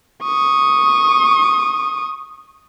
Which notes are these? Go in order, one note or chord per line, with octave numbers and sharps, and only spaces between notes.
C#6 D#6